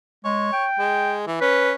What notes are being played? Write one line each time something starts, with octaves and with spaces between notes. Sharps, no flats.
G#3 C#5
G5
G#3
E3
C#4 B4